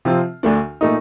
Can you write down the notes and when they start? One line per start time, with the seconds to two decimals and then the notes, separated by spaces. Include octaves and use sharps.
0.05 C3 F3 C4 F4
0.43 D2 D3 A3 D4
0.81 A#2 A3 D#4